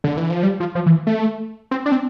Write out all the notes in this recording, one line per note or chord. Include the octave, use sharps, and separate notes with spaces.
D3
E3
F3
G3
F3
F3
E3
A3
C4
D4
C4